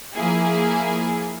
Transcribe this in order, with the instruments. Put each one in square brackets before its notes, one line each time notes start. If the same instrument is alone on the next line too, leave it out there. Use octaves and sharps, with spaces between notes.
[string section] F3 A#3 E4 G#4